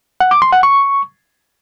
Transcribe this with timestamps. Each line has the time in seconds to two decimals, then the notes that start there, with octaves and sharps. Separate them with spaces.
0.20 F#5
0.31 D6
0.42 C6
0.52 F#5
0.63 C#6